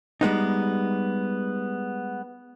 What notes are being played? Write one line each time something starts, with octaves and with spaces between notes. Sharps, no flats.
G3 G#3 B3 D#4